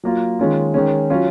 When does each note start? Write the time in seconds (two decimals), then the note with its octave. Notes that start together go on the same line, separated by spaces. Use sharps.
0.04 F#3 A#3 F4
0.39 D#3 G#3 C#4 F4
0.74 D#3 G#3 C#4
1.10 F#3 C#4 F4